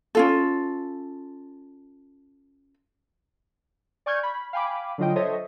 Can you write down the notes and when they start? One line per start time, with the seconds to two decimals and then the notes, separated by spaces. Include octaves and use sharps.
0.15 C#4 F4 A4
4.06 D5 G#5 C#6 F6 G6 G#6
4.23 B5
4.53 F5 G5 G#5 B5 D6
4.98 D3 F#3 F4 D#5 G5
5.16 A4 C5 C#5 D#5 E5